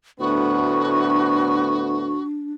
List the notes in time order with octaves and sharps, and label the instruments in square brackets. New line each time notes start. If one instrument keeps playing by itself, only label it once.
[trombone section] D2 A2 B3 [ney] D4 [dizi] F#4